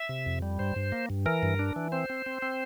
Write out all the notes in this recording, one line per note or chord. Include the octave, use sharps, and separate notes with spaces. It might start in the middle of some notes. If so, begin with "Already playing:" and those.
Already playing: E5
C3
F2
G3
G2 C5
G2
A#3
G2
E3 A#4
G2
D4
E3
C4 C5
C4
C4
C4